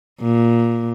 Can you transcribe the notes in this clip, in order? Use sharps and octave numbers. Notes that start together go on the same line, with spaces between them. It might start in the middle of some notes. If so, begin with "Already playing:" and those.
A#2